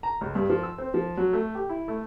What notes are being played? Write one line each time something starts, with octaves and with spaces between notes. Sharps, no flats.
A#5
C#2
G2
F3
E6
C4
F3
F#3
A3
G4
E4
A3